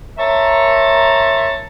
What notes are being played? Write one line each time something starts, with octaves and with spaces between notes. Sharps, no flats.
A#4 C#5 E5 A5 A#5 C6